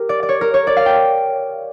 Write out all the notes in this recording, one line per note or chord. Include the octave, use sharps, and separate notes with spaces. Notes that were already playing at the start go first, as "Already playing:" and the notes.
Already playing: G4 A#4
D5
D5
C#5
A#4
C#5
D5
F5
G5